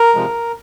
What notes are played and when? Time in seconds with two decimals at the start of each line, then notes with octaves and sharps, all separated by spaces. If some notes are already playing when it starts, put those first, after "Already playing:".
Already playing: A#4
0.14 C3 F3 G#3